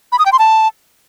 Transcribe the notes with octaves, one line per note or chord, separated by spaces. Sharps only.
B5
D#6
G5
C6
A5